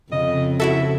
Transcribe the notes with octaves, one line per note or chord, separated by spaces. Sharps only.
F2 C#3 D#5
E4 F#4 A4 E5